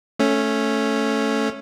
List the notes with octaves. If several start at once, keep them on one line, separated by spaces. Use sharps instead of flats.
A3 C#4